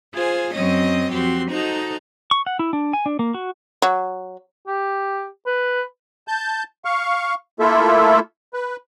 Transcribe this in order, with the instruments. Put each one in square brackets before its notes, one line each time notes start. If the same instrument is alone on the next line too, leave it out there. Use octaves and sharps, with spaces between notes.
[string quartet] F4 G#4 C5 G#5
F#2 F#3 C4 C#4 D#5 D#6
F2 C4 F#4 G4 C6
D#4 F#4 A4 C5 D#5 A#5
[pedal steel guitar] C#6
F#5
E4
D4
G#5
D4
A#3
F#4
[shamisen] F#3
[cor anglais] G4
B4
[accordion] A5 G6
F5 C#6
A3 A#3 E4 F4 A4 E5
B4